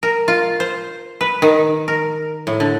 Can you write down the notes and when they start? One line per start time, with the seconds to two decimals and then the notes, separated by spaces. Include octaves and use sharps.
0.03 A#4
0.28 F4
0.60 C5
1.21 B4
1.42 D#3
1.88 A#4
2.47 A2
2.60 D3